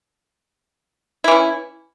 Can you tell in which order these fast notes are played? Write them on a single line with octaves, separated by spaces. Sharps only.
E4 E3 C#4